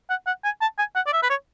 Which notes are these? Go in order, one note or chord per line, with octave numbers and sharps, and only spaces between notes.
F#5
F#5
G#5
A5
G#5
F#5
D5
E5
B4
C#5